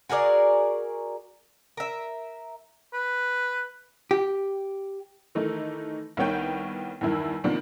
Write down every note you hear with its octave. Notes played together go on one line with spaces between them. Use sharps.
F#4 G#4 A#4 D5
A#4 E5
B4
G4
D#3 E3 A3 D#4
C2 D#3 B3 C#5 G5 G6
E2 G2 D#3 E4
C3 D#3 F3 A#3 B3 D4